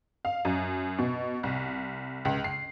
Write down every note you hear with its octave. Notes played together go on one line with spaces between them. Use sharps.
F5
F#2
B2
C2
C#2
C7